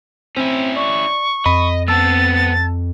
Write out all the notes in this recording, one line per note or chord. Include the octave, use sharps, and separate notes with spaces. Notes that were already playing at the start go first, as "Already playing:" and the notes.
C4 C#4 E4
D5 C#6
F2 D#5 B5
B3 C4 A5 E6 A6